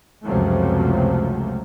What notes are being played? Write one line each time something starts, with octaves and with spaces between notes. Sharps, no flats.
C#2 F#2 C3 F3 F#3 A3